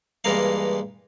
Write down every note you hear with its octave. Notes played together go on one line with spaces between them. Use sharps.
G2 E3 G#3 A#3 A#4 F5